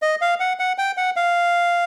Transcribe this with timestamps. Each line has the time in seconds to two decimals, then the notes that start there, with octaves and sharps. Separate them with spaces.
0.02 D#5
0.21 F5
0.40 F#5
0.59 F#5
0.78 G5
0.97 F#5
1.16 F5